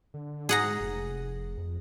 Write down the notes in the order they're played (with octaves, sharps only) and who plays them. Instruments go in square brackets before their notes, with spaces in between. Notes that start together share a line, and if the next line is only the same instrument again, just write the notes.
[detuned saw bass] D3
[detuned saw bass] G#2 [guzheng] G#4 F#5 A#5
[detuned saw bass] F1
F2